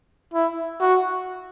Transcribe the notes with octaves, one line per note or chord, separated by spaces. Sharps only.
E4
F#4